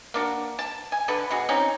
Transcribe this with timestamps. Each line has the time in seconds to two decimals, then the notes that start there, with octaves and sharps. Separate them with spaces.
0.14 A#3 D4 F#4
0.59 A5
0.92 G#5
1.08 D3 A4 B4
1.31 B2 F#4 G#4
1.49 C4 C#4 D#4